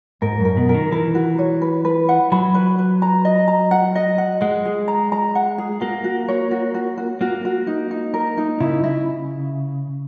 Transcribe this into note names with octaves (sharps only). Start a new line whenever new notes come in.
G#2 A#4
F#2 A#4
B2
A#4
D#3
E3 A#4
F#4
C#5
B4
B4
F#5
F#3 B5
B4
B4
A#5
D#5
A#5
F#5
D#5
F#5
G#3 F#5
G#4
A#5
A#5
F#5
G#4
A#3 F#4
F#4
C#5
F#4
F#4
F#4
A#3 F#4
F#4
D#4
D#4
A#4
D#4
C#3 E4
E4